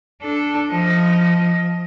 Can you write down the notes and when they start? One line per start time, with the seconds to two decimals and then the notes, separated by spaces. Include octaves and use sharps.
0.23 D4 A4
0.71 F3 D#5